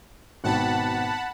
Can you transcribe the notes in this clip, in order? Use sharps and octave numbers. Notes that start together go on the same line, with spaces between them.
G#1 B2 F#5 G5 A5 B5